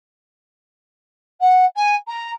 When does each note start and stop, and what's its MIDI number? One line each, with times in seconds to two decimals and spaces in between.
1.40 1.65 78
1.76 1.95 80
2.07 2.31 82